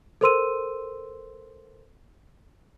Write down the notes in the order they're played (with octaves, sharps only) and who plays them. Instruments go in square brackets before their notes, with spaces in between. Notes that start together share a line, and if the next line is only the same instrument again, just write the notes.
[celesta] A4 A#4 C5 C6 E6 D#7